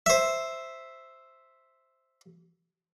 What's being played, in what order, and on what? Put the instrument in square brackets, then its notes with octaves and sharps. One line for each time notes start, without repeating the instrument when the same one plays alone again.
[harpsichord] C5 E5